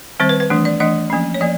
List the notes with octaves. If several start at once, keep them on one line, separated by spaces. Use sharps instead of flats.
D#3 G3 C4 C5
B4
B4
E3 A3 D4
D5
E3 A3 D4 D#5
F3 A#3 C#4
C#5
F3 A#3 D5